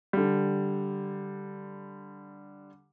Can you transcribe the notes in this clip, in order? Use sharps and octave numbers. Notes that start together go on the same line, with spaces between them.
D3 G3